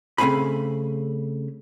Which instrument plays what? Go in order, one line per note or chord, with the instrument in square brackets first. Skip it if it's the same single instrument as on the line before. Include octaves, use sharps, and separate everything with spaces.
[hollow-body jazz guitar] C#3 A3 C4 F5 G#5 B5